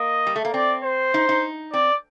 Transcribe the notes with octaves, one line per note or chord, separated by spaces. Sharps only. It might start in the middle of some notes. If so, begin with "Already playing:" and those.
Already playing: A#3 D#5
G3
A3
A#3
C4 D5
C5
D#4
D#4
C4 D5